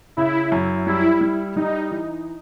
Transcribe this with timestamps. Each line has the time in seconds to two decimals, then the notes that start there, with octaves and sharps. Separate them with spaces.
0.17 C#3 E4
0.52 F#2
0.87 G3 E4
1.21 G3
1.56 G3 D#4
1.91 E3